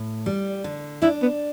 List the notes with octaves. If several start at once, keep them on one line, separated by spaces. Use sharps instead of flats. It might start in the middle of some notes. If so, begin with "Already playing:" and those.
Already playing: A2
G3
D3
D4 E4
B3